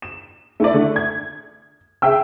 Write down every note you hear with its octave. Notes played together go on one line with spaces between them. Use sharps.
E7
A3 E4 D5
D3 A3
G#6
G#4 E5 G5 E6